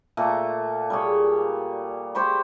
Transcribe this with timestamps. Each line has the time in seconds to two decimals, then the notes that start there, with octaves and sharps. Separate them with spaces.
0.17 A#2 A3 A#3 A#5
0.90 G3 G#4 C#5
2.15 G4 C5 B5 C#6